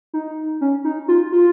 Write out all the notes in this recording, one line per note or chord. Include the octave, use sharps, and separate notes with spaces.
D#4
C#4
D#4
F4
F4